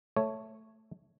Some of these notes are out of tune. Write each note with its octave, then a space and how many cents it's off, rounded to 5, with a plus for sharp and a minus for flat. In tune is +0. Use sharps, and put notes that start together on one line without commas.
A3 +0 C#5 +0